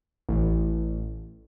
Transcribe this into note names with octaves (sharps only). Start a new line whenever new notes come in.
A1